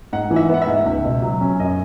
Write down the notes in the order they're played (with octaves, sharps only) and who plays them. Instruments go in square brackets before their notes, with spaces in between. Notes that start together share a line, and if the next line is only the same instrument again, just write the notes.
[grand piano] G#2 [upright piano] F#5
[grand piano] E3
[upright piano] E5
[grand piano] B3 [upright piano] F#5
[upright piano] E5
[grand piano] G#2
C#2
B2
F#3
C#4
[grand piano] F#2 [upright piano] D#5